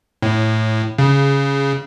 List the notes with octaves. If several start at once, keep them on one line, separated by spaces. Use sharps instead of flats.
A2
C#3